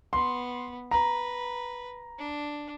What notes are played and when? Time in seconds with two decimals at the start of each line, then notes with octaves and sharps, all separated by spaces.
0.13 B3 C6
0.91 B4 A#5
2.18 D4